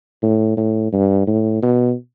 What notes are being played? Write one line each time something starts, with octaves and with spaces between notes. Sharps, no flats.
A2
A2
G2
A2
B2